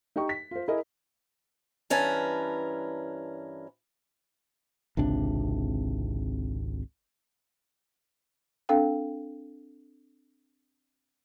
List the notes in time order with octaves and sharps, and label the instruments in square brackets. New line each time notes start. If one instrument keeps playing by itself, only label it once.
[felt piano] D#4 G4 D#5 G5 C#6
B6
F4 C5
E4 G#4 A#4 D#5
[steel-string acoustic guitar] G2 E3 C#4 A#4 B4 A5
[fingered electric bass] G#1 C#2 C3 D4
[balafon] C4 D4 A4 F5 G5